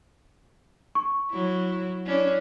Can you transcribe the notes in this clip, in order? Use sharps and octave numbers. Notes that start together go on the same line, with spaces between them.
C#6
F#3 E4
C#4 D4 E4